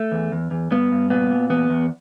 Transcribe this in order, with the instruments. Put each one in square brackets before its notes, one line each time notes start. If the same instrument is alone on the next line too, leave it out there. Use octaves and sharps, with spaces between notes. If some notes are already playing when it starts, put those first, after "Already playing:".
Already playing: [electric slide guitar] A3
E2
E2
E2
G2 B3
G2
A#2 B3
A#2
E2 B3
E2